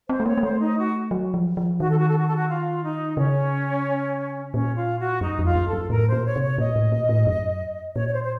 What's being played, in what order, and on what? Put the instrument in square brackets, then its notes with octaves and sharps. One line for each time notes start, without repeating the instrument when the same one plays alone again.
[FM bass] C4 [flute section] C5
[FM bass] A3
[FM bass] A#3 [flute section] C#5
[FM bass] A#3
[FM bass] A3 [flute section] C5
[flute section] D#4
F#4
[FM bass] F#3
F3
F3
[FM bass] D#3 [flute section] F#4
[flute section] A4
F#4
A4
F#4
A4
F#4
F4
D#4
[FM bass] C#3 [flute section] C#4
[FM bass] A#2 [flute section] C#4
[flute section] F4
F#4
[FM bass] F#2 [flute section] D#4
[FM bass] F2
[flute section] F4
[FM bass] F#2
[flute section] A4
[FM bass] F#2
[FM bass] A2 [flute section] A#4
[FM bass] A#2 [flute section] C5
[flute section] C#5
[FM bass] C3
[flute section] C#5
[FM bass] A#2 [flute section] D#5
[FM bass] A2
A#2
A2
F#2
[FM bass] A#2 [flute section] C#5
[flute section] C#5
C5
C5